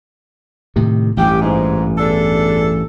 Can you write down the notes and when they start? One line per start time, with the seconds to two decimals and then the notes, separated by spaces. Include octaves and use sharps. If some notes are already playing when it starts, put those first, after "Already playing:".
0.76 A2 C3 D#3
1.17 A1 G2 G4
1.41 G#2
1.98 E2 D4 A4